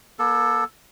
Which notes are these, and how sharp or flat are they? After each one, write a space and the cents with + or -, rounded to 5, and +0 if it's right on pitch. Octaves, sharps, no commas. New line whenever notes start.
A#3 +40 A4 +0